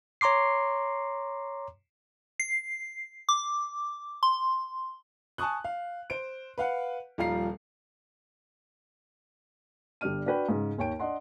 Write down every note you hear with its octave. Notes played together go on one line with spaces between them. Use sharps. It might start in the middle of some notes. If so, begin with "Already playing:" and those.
C#5 A#5 C6 D6 C7
C7
D6
C6
G#5 A5 C#6 D#6 F#6
F5
C5 D7
B4 F5 F#5
D#1 F3 G3 F5 A#5 C7
G1 G3 D4 D5 F6 D#7
D4 F#4 B4 G5
G#2 C#3
D#2 C#5 G5 D7
D4 D#5 F#5 C6